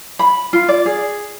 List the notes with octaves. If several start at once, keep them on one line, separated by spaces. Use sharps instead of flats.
B5
F4
D5
G#4